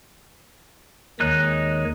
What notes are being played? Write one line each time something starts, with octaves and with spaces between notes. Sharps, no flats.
D#2 D#3 G#3 D#4 C#5 F#6